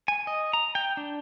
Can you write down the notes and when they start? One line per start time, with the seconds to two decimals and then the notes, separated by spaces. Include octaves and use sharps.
0.08 G#5
0.27 D#5
0.53 A#5
0.75 G5
0.97 D4